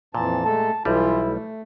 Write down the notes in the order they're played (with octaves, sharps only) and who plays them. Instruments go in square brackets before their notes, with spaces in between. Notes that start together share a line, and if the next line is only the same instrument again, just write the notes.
[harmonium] F2 E3 A5 [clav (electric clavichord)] A#2
[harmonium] G#3 A3 A4 [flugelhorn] A5
[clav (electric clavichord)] B1 G3 [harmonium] E3 F4 [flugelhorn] E4
[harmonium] A3